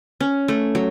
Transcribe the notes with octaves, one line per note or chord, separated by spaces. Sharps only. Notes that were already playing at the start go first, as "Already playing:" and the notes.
C#4
A3
F#3